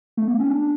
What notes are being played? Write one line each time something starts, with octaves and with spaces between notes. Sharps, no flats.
A3
B3
C#4
D4